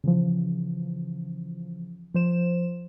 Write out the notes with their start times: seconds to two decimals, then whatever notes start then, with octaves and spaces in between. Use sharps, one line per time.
0.04 C#3 E3 F3
2.14 F3 C5 E7